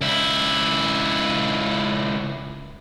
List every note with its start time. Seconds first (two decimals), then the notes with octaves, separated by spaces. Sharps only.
0.01 C#2 E4